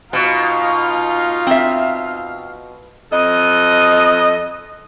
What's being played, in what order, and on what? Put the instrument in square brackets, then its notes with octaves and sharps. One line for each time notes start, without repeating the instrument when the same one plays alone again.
[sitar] B2 [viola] D#4 F4 [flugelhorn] F5
[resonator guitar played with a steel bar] C4 E5
[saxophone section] F2 A4 D#5